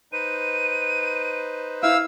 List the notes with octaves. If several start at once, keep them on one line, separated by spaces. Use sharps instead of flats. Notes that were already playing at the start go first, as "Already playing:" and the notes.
D#4 B4 C5 D#7
E4 F5 E6